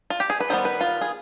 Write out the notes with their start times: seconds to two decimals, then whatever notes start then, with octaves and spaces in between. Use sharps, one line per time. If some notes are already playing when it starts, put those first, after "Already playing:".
0.10 F4
0.20 G4
0.30 G#4
0.40 B4
0.50 D#3 G3 B3 C5
0.65 B4
0.81 F4
1.01 G#4